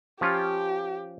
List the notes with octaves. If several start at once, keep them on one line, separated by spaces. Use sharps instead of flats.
F3 C#4 F4 G4